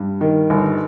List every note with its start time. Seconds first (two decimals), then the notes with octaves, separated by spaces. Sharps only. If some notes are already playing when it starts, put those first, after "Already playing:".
Already playing: G2
0.21 D#3
0.50 G1